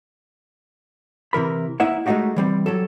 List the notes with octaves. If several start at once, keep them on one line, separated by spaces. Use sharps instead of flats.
C3 E3 A#4 B5
A#3 D#4 E4 E5 F#5
G#3 A3 C4 D#4 F#4 G4
E3 G3 C4
F#3 G4 A4